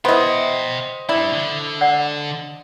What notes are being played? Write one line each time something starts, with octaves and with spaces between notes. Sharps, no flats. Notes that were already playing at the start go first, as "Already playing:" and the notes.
B3 E4 C5 D#5 E5 G5
G3 D4 E4 D5
D3
D5 F#5 E6